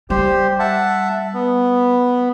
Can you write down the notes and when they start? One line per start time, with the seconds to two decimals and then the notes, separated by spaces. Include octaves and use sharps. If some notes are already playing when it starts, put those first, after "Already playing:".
0.10 G3 G4 C5
0.59 E5 F#5 A5
1.34 B3